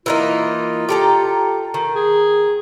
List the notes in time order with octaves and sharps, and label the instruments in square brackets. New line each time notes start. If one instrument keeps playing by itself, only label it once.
[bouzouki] E3 A#3 D#4 [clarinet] F4
[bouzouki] G4 A4 A#5
D#3
[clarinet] G#4